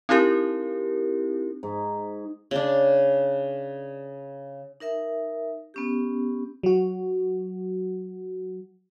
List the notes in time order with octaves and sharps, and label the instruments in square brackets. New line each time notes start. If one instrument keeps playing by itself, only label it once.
[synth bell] C4 D#4 E4 G4 A#4
[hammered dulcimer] G#2
[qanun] C#3 D4
[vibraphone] D#4 A#4 E5
B3 C#4 G4
[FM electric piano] F#3 F#4